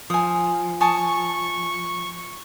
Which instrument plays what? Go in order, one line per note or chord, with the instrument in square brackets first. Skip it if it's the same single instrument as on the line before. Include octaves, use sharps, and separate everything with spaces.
[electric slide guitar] F3 [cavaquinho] G#5 D#6
[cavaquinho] G#5 A5 D#6 [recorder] C#6